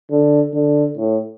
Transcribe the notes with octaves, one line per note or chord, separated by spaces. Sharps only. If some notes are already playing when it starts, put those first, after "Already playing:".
D3
D3
A2